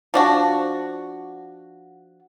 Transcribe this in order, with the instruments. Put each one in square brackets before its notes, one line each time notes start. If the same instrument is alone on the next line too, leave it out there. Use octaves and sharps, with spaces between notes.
[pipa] F3 D4 F#4